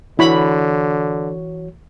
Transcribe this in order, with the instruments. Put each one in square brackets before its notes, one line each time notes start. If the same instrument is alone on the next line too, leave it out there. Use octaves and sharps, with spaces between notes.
[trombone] D3 [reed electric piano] E3 F#4 C#5 [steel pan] E4 B5